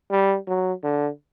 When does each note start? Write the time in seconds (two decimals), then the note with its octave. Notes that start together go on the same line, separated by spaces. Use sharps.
0.11 G3
0.47 F#3
0.84 D3